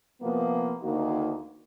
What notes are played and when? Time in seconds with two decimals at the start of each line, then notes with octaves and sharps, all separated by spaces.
0.21 C3 F3 A#3 B3
0.81 D2 D#3 A#3 D#4 F#4